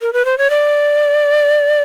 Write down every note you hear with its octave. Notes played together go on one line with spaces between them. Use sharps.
A#4
B4
C5
C#5
D5